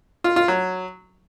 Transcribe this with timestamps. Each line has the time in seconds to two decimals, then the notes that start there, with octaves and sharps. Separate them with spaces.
0.24 F4
0.36 F4
0.48 F#3